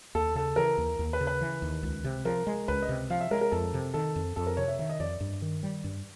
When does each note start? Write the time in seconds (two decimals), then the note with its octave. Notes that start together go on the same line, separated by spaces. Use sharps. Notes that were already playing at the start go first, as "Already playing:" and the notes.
0.15 D#2 A4
0.35 C#3 A4
0.56 E3 A#4
0.78 D#2
0.99 D#2
1.13 B4
1.20 C#3
1.27 B4
1.41 E3
1.62 D#2
1.83 C#2
2.04 C3
2.25 F3 A#4
2.47 G#3
2.68 C#2 B4
2.82 D#5
2.89 C3
3.10 F3 F5
3.21 E5
3.31 G#3 A#4
3.41 A#4
3.51 F2 A4
3.74 C3
3.94 D#3 A4
4.16 F2
4.36 F2 A4
4.47 A#4
4.57 C3 C#5
4.68 E5
4.79 D#3 E5
4.89 D#5
5.00 F2 D5
5.20 G2
5.42 D#3
5.63 G3
5.84 G2